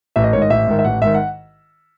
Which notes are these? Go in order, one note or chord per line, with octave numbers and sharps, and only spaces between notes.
A1 E5
D#5
G#2 D#3 C#5
D#5
A1 E5
G#2 D#3
E5
A1 F#5
G#2 D#3 E5
F#5